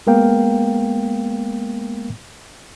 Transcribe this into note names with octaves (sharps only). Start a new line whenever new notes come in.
G#3 A#3 B3 A#4 F5 G5